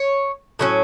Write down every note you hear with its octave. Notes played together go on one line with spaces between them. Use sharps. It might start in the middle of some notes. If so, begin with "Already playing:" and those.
Already playing: C#5
A2 F#3 C#4